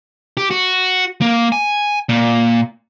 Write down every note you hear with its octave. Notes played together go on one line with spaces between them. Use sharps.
G4
F#4
A#3
G#5
A#2